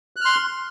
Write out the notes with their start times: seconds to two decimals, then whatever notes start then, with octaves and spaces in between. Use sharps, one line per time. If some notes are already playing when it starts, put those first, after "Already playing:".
0.16 F#6
0.21 F6
0.25 C6